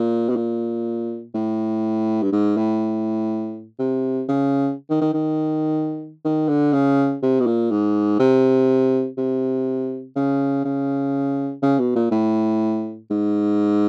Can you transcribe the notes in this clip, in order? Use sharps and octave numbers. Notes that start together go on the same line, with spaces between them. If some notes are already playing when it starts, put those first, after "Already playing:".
Already playing: A#2
B2
A#2
A2
G2
G#2
A2
C3
C#3
D#3
D#3
D#3
D#3
D3
C#3
C3
B2
A#2
G#2
C3
C3
C#3
C#3
C#3
B2
A#2
A2
G#2